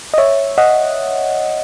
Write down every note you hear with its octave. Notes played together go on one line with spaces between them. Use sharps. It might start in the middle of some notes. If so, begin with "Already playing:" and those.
D#5
C#5 E5
D#5 F#5